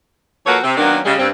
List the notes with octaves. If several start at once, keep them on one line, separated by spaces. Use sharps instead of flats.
F3 A#3 F#4 A4 B4 C#5
C3 C4
D#3 F#3 A#3 B3 C#4 D4
C#3 G3 G#3
G2 C4